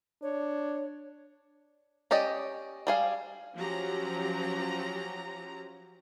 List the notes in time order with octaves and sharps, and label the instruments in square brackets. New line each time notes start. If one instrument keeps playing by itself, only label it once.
[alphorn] D4 [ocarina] C#5
[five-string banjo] C#4 G4 D5 D#5
G3 G#4 F5
[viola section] F3 F#3 C#4 G4 A#5